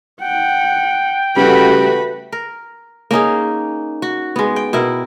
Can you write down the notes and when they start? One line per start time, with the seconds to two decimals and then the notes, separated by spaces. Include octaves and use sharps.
0.22 F#5 G5
1.36 C#3 G3 A3 F#4 B4 B5
2.32 A#4
3.11 A#3 C#4 D#4 G#4
4.02 F#4
4.36 G#3 B3
4.56 G5
4.73 B2 E4 A#4